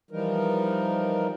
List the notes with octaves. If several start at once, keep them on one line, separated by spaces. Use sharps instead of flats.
E3 F3 G3 D#4 A#4